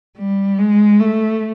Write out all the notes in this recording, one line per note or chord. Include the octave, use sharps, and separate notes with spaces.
G3
G#3
A3